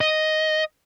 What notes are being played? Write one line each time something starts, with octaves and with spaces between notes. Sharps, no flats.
D#5